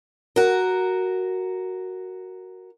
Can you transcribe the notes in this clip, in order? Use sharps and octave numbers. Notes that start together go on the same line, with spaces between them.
F#4 A#4